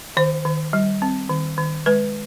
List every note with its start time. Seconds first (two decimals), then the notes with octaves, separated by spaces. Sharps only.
0.17 D#3 C5
0.45 D#3
0.73 G3
1.02 C4
1.29 D#3
1.58 D#3
1.86 G#3 B4